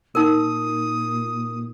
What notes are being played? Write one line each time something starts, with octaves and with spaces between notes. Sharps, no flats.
A#2 D#4 A#4 D#6